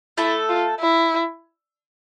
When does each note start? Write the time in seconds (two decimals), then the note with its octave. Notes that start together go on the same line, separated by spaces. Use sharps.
0.18 A3 E4 A4
0.49 F4
0.80 E4